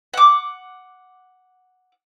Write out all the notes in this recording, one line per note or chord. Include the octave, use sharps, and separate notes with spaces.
F#5 D6